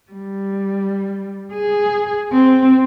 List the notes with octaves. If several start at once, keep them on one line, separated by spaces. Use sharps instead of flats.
G3
G#4
C4